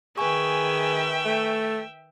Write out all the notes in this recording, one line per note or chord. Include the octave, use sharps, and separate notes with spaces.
D#3 G#4 B4 E5 G5 G#5 C#6
A3